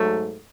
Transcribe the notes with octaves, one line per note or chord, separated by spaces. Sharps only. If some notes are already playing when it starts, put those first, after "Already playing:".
Already playing: G#2 F#3 A3